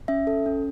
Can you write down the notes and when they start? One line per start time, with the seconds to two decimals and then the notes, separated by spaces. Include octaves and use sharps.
0.08 C#4 E5
0.27 A4
0.46 C#4